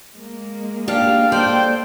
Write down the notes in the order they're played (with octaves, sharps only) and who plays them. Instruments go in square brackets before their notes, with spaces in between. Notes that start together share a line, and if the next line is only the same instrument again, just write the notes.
[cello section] G#3 A#3
[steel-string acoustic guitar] D4 G4 [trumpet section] F5
[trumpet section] A4 C5 G5 [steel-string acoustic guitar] D5